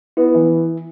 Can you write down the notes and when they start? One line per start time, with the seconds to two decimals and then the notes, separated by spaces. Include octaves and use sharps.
0.17 B3 E4
0.34 E3